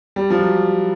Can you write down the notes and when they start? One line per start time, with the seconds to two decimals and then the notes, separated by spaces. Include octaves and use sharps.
0.16 G3
0.30 F3
0.39 F#3